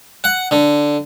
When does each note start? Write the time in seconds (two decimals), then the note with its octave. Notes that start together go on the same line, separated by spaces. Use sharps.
0.24 F#5
0.51 D3